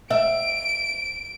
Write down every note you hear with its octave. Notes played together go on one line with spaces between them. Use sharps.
E5 D7